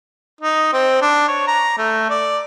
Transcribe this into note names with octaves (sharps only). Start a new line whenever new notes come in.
D#4
C4
D4
C#5
A#5
A3
D5